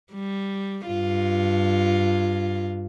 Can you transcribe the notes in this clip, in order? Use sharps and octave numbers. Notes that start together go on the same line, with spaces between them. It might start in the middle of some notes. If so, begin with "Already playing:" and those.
G3
G2 F4